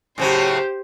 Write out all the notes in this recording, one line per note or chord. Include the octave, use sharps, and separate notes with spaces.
A2 C#3 F#3 G4 C5